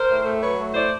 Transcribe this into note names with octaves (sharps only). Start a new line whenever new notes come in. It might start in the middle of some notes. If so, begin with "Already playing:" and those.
Already playing: A#4 C5
A2
A3
F#3 B4 C#5
A3
A2 C5 D5